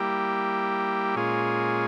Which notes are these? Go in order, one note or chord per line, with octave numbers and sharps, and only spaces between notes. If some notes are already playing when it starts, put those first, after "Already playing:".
Already playing: G3 A#3 E4 G4
A#2 G#3 C#4 F4 G#4